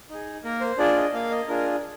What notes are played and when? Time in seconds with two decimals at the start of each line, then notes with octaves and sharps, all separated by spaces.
0.10 D#4 G#4
0.44 A#3 A#4
0.61 C5
0.78 D4 F4 G#4 D5
0.97 D#5
1.13 A#3 F5
1.31 D#5
1.48 D4 F4 G#4 A#4